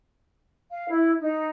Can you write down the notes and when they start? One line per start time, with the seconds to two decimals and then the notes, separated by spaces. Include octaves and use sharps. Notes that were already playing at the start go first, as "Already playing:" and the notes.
0.69 F5
0.88 E4
1.19 D#4